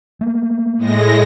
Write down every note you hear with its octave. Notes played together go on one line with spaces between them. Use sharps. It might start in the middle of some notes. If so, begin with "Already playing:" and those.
A3 A#3
A2 G#3 A#6